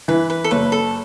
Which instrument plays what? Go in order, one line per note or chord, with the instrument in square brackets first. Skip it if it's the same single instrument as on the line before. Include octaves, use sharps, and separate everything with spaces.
[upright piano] E3 [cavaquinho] B4
[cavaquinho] B4
A4
[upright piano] F#1 [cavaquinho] B4
[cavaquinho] A4